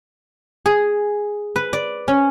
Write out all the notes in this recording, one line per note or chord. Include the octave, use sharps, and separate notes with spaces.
G#4
B4
D5
C#4